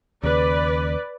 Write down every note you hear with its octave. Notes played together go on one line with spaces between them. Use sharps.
D#2 C#3 B4 D5